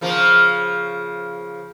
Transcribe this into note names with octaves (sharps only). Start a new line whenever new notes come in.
C#3 F3 A#3